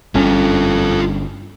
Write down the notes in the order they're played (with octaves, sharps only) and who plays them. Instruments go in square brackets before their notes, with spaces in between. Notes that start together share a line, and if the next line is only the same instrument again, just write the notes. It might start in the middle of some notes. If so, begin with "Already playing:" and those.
[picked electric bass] G1 C#4 [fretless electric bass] G3 D4 [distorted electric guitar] F4 A4